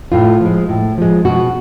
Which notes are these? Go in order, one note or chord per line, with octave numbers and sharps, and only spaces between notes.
A2 F4
F3 G#3
A2
F3 G#3
B2 F#4